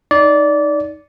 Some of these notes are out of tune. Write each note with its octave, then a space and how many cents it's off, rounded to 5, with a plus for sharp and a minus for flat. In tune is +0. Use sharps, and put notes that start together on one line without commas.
D#4 +0 D5 -20